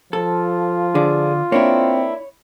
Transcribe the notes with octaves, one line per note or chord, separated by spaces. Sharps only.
F3 F4 A4
D3 G#4 D5
A#3 C4 D4 E4 C#5